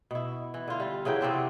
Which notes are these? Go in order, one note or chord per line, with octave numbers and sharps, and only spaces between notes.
B2 E4
E3
D3 F4
G3
C#3 E3 F#3 G5
C3 B3 C4 D5